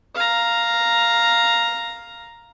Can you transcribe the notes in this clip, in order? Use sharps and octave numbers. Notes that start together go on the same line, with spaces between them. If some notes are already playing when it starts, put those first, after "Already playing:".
F5 A#5